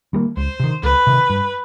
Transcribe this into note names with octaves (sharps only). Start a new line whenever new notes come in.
D#3 G3 A#3
C#2 C5
C3 D#3
C#2 B4
C3 D#3
G2